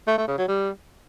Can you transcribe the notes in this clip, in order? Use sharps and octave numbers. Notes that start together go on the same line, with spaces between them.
A3
A3
C#3
F#3
G3